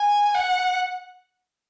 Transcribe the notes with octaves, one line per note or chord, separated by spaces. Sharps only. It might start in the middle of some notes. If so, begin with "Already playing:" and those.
Already playing: G#5
F#5